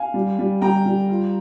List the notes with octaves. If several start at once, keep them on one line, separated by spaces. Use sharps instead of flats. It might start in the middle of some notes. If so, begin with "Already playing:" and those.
Already playing: F5 G#5
G3
G3
G3 G5 A#5
G3
F4